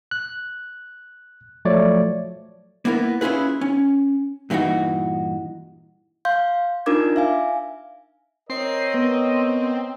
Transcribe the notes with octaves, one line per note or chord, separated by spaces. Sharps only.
F#6
F3 F#3 A3 C#5 D5
A#3 B3 E4 A#4
C#4 E4 F4 G#4 B4
C#4
G2 A#2 E3 D#4 F#4
F5 C6 G6
D4 D#4 F4 A#4 D6 G#6
E5 F5 G#5
C4 A#4 C#5 D#5 C7
B3